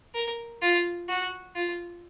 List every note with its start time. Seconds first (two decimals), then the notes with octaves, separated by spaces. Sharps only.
0.15 A#4
0.62 F4
1.09 F#4
1.56 F4